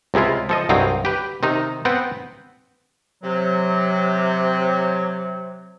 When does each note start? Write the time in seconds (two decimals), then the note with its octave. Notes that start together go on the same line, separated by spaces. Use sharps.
0.14 C#2 C3 G#3 E4 F4
0.49 F3 A4 D#5
0.69 C2 G2 F#3 C4 D#5 F5
1.05 G4 B4
1.43 C3 D#3 D#4
1.85 B3 C4 B4 F#5 G5
3.23 C3 F#3